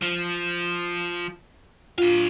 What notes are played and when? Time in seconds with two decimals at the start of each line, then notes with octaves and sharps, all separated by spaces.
0.02 F3
1.98 D4 F4 F5